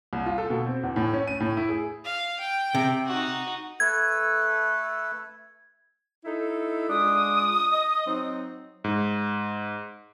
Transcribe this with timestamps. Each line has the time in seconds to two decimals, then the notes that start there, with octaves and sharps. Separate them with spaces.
0.13 C2
0.26 F4
0.38 A4
0.50 B2
0.66 C4
0.83 E2
0.96 A2
1.13 C#4
1.27 D#7
1.40 A2
1.57 E4
1.69 G#4
2.05 F5
2.41 G5
2.75 C3
3.07 D#4 F#4
3.80 A3 A4 B4 G#6
6.25 D#4 E4 A4
6.89 G#3 D4 F4 D#6
7.72 D#5
8.06 F#3 C4 D#4
8.84 G#2